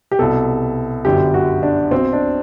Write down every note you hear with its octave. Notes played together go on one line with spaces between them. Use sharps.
G4
C2 B2 A4
G1 F#2 D3 G4
F#4
D4
B1 B2 C4
D4